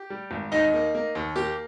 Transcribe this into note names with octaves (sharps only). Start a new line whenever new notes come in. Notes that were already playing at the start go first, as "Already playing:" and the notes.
Already playing: G4
G3
G#1
D#2 D#4 D#5
A#3
A#3
D#2
A#3 G4